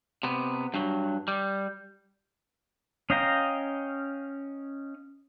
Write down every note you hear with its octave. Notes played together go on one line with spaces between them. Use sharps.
C3 B3
G2 F#3
G3
C#4 D#5 F5 G5 A#5